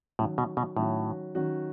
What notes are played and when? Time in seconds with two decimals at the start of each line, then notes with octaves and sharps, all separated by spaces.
0.19 A2 D#3 F#3 C#4 F#4
0.38 B2
0.57 B2
0.76 A2 D#3 F#3 C#4 F#4
1.35 D#3 F#3 C#4 F#4